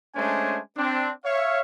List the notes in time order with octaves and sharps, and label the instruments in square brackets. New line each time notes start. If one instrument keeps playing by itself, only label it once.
[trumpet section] G#3 A3 C#4 D4 C5 G#5
C4 D4
C#5 E5 F5